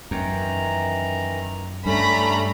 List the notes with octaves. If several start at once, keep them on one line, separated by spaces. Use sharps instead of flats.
F#2 D#3 E3 A#5
G2 G3 A3 C#4 A#5 B5